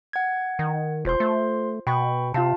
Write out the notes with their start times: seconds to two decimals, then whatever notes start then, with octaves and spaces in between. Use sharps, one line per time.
0.13 F#5 G#6
0.59 D#3
1.05 E1 F4 C5 C6
1.20 A3
1.87 B2 G5 B5 C#6
2.34 C3 F4 F5 A5